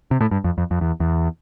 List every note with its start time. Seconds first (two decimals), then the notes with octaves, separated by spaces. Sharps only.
0.11 C3
0.21 A2
0.31 G2
0.44 F2
0.58 F2
0.71 F2
0.81 E2
1.00 E2